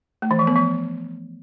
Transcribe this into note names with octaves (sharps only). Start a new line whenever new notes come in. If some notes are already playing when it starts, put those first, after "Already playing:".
A3
E3
F3
B3
F3